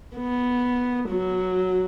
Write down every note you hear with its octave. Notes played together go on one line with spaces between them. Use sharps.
B3
F#3